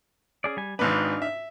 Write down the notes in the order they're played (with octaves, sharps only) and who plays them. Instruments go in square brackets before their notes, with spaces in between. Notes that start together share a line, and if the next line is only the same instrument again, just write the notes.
[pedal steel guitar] C#4 G#4 D5
G3 G#5
[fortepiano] G#1 G#2 B4 [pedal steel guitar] D4 D#4 F5
[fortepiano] E5